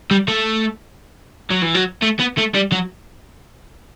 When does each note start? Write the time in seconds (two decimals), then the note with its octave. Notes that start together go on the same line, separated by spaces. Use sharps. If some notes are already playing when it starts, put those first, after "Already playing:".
0.11 G3
0.28 A3
1.51 F#3
1.62 E3
1.75 F#3
2.02 A3
2.20 B3
2.38 A3
2.55 G3
2.72 F#3